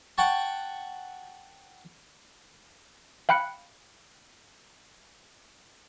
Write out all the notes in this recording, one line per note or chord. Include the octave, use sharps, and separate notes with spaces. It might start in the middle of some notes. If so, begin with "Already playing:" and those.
F#5 G5 A5 C#6
F5 G5 B5 F#6 C#7